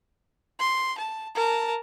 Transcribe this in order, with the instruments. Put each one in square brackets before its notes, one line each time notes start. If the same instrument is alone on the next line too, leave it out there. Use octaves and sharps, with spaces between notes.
[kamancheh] C6
A5
A#4 A5